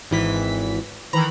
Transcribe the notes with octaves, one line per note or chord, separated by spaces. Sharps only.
G#1 E3 B6
D#3 E3 A#5 B5